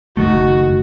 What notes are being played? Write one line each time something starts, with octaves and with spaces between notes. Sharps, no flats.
F#1 D#3 A3 F#4